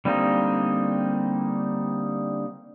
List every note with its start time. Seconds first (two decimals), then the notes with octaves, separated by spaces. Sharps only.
0.05 D3 G3 A#3 C4 D#4